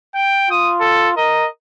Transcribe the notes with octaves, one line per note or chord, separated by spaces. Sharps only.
G5
F4 D#6
A4
A#4 D#5